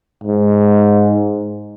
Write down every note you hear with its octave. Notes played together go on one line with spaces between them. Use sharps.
G#2